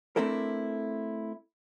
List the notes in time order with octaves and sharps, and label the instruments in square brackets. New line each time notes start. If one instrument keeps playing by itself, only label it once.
[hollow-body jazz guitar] A3 C4 D4 E4 A4 A#4